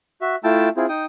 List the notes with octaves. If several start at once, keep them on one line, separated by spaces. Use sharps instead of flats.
F#4 E5
A3 E4 F4 G5 A5 E6
C4 E4 F4 G#4
D#4 G5 D#6